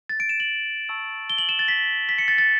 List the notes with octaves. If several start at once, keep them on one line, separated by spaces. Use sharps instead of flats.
A6
D7
E7
F#7
A5 C#6 E6
G7
F#7
E7
A6
B6
B6
C#7
A6
A6